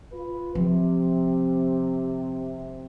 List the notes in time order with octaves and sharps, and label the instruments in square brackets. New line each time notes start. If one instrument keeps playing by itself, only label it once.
[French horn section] F4 B4
[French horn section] C3 [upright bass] F3